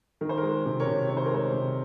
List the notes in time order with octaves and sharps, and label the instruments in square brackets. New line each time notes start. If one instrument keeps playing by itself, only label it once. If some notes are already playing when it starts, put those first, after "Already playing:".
[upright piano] D#3 A#4
C5
A#4
G#3
C3
A#4 C#5
C3
D#3 C#5
C5
A#4
G#3 C5
C3